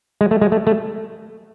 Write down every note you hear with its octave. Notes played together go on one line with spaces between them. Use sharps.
G#3
A3
G#3
A3
A3